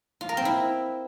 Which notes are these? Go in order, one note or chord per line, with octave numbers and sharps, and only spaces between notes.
F4
A#4
C4
E4